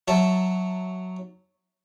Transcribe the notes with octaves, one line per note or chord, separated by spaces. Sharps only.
F#3 E5 A5